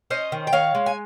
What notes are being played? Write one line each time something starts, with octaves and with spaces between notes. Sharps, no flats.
C#4 C5 D#5
D#3
G5
D#3 C#5 F5
G#3
G#5